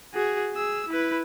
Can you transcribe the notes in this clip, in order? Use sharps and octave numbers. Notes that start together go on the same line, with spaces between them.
F#4 G#4
G#4 E6
E4 B4